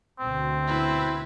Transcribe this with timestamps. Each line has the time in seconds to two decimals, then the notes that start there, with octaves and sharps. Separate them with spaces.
0.19 D2 B2 C4
0.67 E4 B4